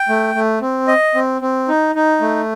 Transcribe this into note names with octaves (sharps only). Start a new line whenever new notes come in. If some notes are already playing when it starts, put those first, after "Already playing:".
Already playing: G5
A3
A3
C4
D#5
C4
C4
D#4
D#4
A3